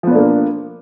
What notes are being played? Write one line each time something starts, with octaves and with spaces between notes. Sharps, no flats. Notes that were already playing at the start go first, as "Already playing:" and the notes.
F3 A#3 B3 D4